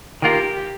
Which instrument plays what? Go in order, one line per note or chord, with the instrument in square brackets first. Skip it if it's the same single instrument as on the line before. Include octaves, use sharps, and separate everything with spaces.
[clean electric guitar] D#3 A#3 F4 A#4 [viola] G4